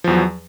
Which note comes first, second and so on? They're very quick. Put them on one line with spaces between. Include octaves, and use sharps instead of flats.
F3 E2 F#3